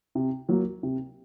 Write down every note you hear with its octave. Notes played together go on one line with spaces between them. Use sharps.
C3
F#3 A#3
C3